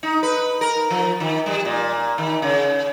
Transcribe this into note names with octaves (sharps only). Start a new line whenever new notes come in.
D#4
B4
A#4
F3
D#3
G3
A#2
D#3
C#3